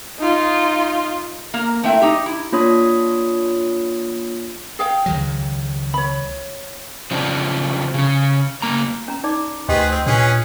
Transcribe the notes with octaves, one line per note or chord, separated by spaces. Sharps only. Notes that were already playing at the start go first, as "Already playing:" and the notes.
D#4 F4
A#3 A#4
A3 C4 E4 E5 G5
D#4 G4
E4
A#3 D4 F4 C#5 B5 D#6
G#4 F5 G5
C#2 D#3 F#3
C#5 B5
C#3 F3 F#3 C4 D4
C#3 C#4
C#3 F#3 A#3 A#5
C#4 A#5
D#4 D5 D6
D2 G4 G#4 B4 C5 D#5 G5
C4
A#2 C#4 D4 G#4 B4